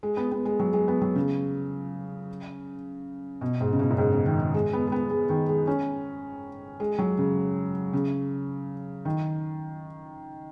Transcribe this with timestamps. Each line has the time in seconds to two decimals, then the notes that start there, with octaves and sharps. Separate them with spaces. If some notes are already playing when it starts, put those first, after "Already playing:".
0.03 G#3
0.17 B3
0.32 B3
0.45 G#3
0.60 F#3
0.73 G#3
0.88 B3
1.02 F#3
1.15 C#3
3.41 B2
3.61 G#2
3.73 C#3
3.79 B2
3.90 F#2
3.98 G#2
4.12 C#3
4.26 D#3
4.40 D#3
4.54 G#3
4.73 B3
4.87 G#3
4.92 B3
5.10 G#3
5.29 D#3
5.49 G#3
5.67 C#4
6.80 G#3
6.98 F#3
7.18 C#3
7.93 C#3
9.05 D#3